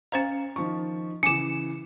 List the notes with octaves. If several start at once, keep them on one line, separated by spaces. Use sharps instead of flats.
C#4 C5 F5 A#5 C#7
D#3 F3 C#6
C#3 E3 G#5 D6 C#7 E7